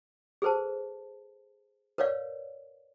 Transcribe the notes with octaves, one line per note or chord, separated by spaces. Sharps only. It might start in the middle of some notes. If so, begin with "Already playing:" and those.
G#4 A4 B4 C5 A5
A#4 B4 C#5 D5 F5